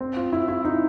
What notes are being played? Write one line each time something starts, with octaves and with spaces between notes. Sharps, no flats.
C4
F4
E4
E4
D#4